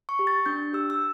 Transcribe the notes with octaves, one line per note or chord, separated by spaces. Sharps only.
C#6
G4
A6
D4 G6
G4 E6
E6